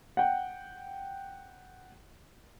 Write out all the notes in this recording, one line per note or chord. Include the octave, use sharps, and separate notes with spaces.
F#5 G5